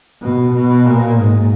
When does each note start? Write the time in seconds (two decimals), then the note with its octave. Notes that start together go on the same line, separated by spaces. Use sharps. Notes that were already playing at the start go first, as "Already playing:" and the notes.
0.22 B2
0.53 B2
0.86 A#2
1.19 G#2